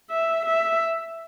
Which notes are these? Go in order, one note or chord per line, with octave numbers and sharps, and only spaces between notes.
E5
E5